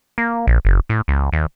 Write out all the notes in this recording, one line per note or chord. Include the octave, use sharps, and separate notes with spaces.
A#3
A#1
F#1
A2
C#2
D#2